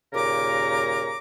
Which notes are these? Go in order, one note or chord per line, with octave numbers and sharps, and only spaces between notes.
D#2 A#2 C#3 A#4 A#5 D6